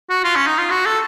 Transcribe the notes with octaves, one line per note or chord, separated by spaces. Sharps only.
F#4
F4
C#4
D#4
F4
F#4
A4